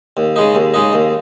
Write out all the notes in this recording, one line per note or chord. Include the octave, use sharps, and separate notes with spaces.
D#2
C#3 G#3 D#4
D#2
C#3 G#3 D#4
D#2